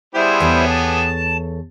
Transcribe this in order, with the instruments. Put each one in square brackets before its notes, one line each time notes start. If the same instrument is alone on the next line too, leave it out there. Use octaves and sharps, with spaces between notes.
[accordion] G3 E4 C5 [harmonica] B3 G4 G#4
[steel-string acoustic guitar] E2 A4 C#5
[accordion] A5